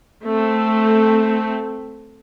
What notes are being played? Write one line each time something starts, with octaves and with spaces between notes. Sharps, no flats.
A3 C4